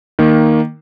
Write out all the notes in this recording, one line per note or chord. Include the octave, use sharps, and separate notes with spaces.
D#3 A#3